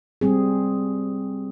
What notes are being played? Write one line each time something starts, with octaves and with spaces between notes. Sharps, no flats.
G3 C4 G#4